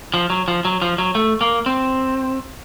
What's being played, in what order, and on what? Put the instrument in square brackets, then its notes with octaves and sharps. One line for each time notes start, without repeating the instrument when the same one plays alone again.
[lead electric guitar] F3
F#3
F3
F#3
F3
F#3
A3
A#3
C4